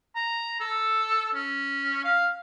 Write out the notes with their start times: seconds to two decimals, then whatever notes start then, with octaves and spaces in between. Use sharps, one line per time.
0.16 A#5
0.60 A4
1.35 C#4
2.05 F5